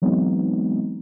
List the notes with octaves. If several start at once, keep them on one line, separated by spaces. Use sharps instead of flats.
E3 F#3 G#3 B3 C4 D#4